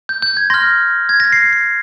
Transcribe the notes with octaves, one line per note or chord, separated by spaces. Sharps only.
G6
G6
G#6
C6 F6 A#6
G#6
A#6
C7
C7